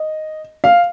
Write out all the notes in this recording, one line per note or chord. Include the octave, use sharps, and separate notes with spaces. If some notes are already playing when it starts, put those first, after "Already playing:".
Already playing: D#5
F5